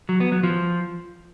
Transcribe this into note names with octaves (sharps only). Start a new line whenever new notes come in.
F#3
B3
F#3
F3